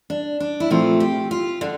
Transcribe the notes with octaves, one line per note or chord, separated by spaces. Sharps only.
D4
D4
E4
A#2 F3 A3 C4 F4
G4
F4
D3 D4